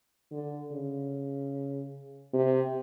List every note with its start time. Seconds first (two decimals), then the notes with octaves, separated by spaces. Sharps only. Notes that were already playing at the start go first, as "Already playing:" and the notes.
0.32 D3
0.72 C#3
2.33 C3